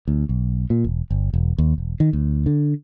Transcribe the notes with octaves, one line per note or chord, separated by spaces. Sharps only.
D2
B1
A#2
E1
G1
E1
D#2
E1
D#3
D2
D3